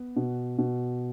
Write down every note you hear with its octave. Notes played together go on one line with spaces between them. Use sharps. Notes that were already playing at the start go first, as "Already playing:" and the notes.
Already playing: B3
B2
B2